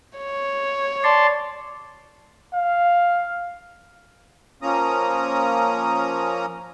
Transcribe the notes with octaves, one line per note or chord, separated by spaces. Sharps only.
C#5
D5 A5 C6
F5
F3 A#3 C#4 A#5 D#6